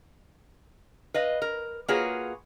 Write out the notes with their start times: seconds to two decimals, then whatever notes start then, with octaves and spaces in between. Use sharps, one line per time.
1.14 B4 D#5 F5
1.42 A#4
1.88 A#3 F4 F#4 G#4 B4 C#5